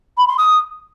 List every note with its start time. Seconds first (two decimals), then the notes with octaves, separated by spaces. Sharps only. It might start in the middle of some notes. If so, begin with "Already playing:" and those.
0.17 B5
0.28 C6
0.38 D#6